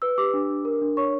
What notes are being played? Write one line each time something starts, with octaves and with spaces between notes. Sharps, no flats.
B4 E6
G4 D6
D4
D4
A#4
D4
C#5 C#6